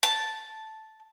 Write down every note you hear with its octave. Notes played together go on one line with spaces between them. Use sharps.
A5